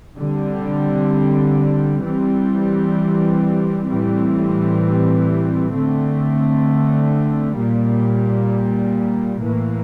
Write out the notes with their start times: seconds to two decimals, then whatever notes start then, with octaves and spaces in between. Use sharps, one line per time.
0.18 D3 G3 C4
2.03 E3 G3 C4
3.88 A2 E3 G3 C4
5.73 D3 A3 C4
7.57 A#2 G3 A#3
9.42 A2 E3 A#3